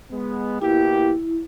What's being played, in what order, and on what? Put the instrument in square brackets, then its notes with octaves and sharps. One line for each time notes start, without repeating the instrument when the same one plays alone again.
[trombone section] G#3 B3
[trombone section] B2 A#3 G4 [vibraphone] E4